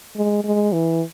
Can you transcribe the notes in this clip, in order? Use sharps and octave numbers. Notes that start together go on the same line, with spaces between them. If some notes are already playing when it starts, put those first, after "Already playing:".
G#3
G#3
E3